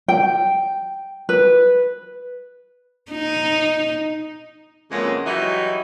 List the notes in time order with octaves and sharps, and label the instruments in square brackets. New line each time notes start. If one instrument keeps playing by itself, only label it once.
[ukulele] G5
B4
[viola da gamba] D#4
[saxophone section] F2 C#3 E3 F#3 G#3 A#3
E3 F#3 G3 D#4 F#4 E5